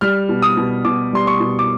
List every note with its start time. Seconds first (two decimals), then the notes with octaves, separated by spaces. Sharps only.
0.01 G3 F6
0.29 B2
0.42 D#6
0.57 B2
0.85 B2 D6
1.13 G3 C6
1.27 C#6
1.40 B2
1.59 D6